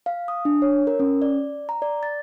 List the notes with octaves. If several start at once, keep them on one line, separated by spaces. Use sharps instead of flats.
F5
D#6
D4
C#5
A#4
C#4
D5
A#5
D5
A6